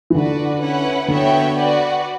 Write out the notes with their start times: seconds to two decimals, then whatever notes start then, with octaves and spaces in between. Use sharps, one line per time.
0.10 E3
0.15 D3 F#4 B4 D5
0.61 C#4 E4 B4 F#5
1.08 D3 B3 F#4 C#5 E5 G5
1.56 F#4 B4 D5